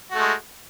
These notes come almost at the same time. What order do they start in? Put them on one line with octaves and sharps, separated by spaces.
F#4 A3 G#3